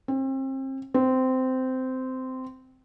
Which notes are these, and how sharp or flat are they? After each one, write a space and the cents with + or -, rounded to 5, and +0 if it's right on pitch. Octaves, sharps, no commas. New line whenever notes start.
C4 +35
C4 -15